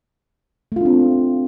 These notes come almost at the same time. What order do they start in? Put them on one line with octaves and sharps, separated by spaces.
A3 F4 D4 C4